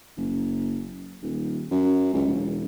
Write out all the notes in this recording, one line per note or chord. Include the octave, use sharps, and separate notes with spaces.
F#1
D#1
F#2
C#2
E1